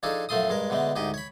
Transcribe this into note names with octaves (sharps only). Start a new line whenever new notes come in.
F3 D4 D#4 G#4 A4
F#2 F3 A3 A4 C6 D#6
G2 G#3 A#4
B2 D3 G#3 A3
D2 G#2 G4 D#5
C#5 B5